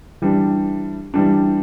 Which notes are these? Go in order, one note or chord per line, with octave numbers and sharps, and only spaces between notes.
E3 G3 D4
E3 G3 D4